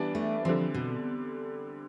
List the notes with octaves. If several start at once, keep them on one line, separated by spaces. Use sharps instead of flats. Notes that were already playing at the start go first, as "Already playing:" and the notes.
Already playing: E3 G3 B3 D4
A3
D3 F3 G3 C4
B2